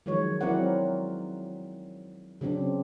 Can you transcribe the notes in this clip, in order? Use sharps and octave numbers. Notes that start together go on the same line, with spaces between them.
D#3 F3 F#3 G#3 C#5
F#3 C4 E4 A#4 D5 F#5
C#3 F#3 C4 D4